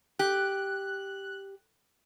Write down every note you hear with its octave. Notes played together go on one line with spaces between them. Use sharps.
G4 F#6